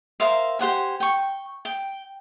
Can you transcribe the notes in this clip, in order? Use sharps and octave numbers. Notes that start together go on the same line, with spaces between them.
A#4 C5 E5 F5
G4 C5 F#5 G#5
G5 C#6
G5